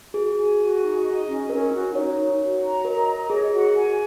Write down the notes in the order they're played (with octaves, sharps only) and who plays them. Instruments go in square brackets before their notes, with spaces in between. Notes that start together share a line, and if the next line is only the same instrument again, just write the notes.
[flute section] F#4 [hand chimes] G#4
[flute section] G#5
F#4
D#4
D#5
C#4
[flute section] C#4 [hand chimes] A#4
[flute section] F#4
[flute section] D#4 [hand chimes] C#5
[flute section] F#4
F#4
A#5
[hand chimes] A#4 [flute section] D#5
[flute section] D#5
[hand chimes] G#4 [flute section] C#5
[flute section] F#4
G#5